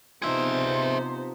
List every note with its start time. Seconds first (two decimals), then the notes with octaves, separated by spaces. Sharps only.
0.22 C3 F3 B3 D#4 G#4 C5 E5